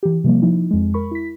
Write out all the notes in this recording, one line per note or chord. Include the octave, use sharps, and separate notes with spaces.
E3 G4
C3 F3 G3 A#3
F3 D#4 E4
F2 G#3
A#4 B5 C#6
E4 B6